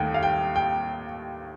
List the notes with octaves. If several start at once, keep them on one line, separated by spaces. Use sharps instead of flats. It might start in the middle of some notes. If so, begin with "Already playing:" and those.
Already playing: D#2 D#3 A3 G5
F5
G5
G5